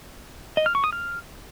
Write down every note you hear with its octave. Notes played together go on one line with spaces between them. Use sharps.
D#5
F6
C#6
D#6
F6